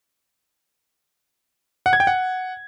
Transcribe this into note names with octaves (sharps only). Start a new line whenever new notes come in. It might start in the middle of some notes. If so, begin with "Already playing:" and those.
F#5
G#6
G5
F#5